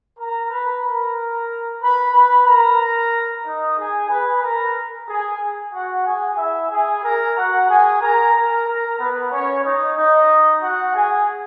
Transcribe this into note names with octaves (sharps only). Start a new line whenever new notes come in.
A#4 A#5
B4 B5
A#4 A#5
B4 B5
B4 B5
A#4 A#5
D#4 D#5
G#4 G#5
B4 B5
A#4 A#5
G#4 G#5
F#4 F#5
G#4 G#5
E4 E5
G#4 G#5
A#4 A#5
F#4 F#5
G#4 G#5
A#4 A#5
A#4 A#5
A#4 A#5
B3 B4
C#4 C#5
D#4 D#5
D#4 D#5
F#4 F#5
G#4 G#5